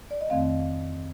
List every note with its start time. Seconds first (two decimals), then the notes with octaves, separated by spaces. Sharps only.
0.11 D5
0.21 D#5
0.30 F2 D#3 A3 C4 F5